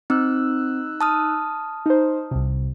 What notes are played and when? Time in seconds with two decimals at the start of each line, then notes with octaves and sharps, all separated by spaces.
0.10 C4 D#4 E6 F#6
1.01 A5 D#6 F6
1.86 D#4 C5
2.31 C2 C3